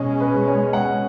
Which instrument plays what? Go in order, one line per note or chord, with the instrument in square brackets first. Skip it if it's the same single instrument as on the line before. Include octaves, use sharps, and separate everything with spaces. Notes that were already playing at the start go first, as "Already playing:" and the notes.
Already playing: [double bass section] B2 G#3 C#4 [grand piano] D#5
[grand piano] B4
C#5
F#5